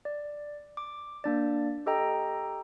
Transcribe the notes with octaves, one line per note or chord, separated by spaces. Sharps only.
D5
D6
A#3 D4 D5
G4 A4 D#5 G5 A#5